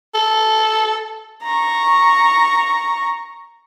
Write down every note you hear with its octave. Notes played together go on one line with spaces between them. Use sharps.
A4
A#5 C#6